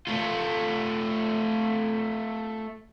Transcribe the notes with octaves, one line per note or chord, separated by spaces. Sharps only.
A3 F4